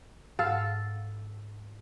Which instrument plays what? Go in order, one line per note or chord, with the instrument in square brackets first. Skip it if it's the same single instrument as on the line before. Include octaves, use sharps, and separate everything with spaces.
[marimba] G#2 F#5 [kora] A4 [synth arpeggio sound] F5